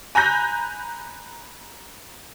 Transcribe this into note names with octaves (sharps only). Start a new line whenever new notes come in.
G#5 A#5 B5 F#6 G6 A#6